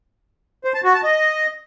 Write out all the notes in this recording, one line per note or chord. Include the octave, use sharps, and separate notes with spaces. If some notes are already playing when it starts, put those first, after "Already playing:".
C5
A5
F#4
A5
D#5